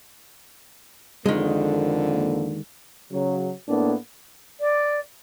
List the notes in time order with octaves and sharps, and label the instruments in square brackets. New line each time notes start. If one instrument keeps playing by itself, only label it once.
[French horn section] F2 D3 A#3 [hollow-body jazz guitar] D#3 G#3
[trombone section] C#3 F#3
A2 A#3 B3 D4
[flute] D5